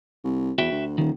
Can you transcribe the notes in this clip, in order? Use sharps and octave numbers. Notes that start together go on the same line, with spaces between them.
C2
E2 F#4 E5 G5
D2
D#1 D#3